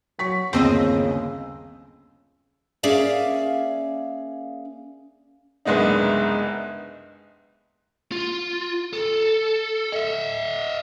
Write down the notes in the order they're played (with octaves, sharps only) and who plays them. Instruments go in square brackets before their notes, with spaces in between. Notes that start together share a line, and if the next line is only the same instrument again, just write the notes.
[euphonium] F#3 [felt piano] C#6 B6
[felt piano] G1 D#2 E6 [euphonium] C#3 [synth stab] C4 D#5
[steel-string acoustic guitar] A#3 C#4 G#4 D5 E5 F5
[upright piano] F#1 C2 G#3 B3 D4 D#4
[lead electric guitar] F4
A4
D#5 E5